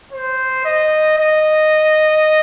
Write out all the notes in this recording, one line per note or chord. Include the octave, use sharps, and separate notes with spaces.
C5
D#5
D#5